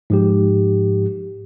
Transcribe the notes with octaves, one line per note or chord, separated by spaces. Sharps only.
G#2 F3 G4